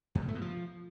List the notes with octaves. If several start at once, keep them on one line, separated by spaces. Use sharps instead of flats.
G2
C#3
A3
B2
F3